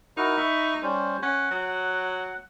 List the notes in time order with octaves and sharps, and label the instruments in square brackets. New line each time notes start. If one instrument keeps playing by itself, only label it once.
[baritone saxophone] D#4 [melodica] E4 F#4 A#4
[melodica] E5 B5 C#6
G3 C#4 C5
[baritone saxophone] C#4 [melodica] F#5
[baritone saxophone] F#3